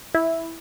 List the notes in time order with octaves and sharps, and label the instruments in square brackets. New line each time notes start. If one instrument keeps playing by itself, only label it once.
[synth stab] E4